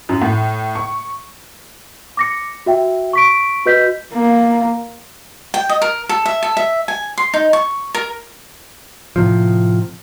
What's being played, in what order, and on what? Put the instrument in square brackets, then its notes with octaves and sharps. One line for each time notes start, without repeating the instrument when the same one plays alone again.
[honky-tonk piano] F#2
A2
C#6
[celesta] D6 A#6 C#7
F#4 E5 G5
C#6 B6 D7
F#4 B4 D#5 G6 B6
[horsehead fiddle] A#3
[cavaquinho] G5
D#5
A#4
A4
E5
A4
E5
G#5
C6
D#4
C#6
A#4
[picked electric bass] A2 C3 F3